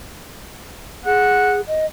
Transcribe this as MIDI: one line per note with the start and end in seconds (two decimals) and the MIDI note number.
1.06 1.61 68
1.06 1.57 78
1.68 1.86 75